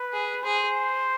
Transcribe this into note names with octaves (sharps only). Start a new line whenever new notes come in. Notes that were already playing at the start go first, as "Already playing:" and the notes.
Already playing: B4
G#4
G#4 C5